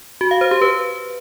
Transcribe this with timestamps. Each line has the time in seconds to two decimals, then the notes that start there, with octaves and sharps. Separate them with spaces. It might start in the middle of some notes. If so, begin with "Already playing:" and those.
0.21 F#4
0.31 F5
0.41 C5
0.51 G4
0.61 B4